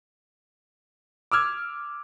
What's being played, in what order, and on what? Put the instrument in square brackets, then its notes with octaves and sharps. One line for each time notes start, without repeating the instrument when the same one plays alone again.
[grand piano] D6 E6 F6 G#6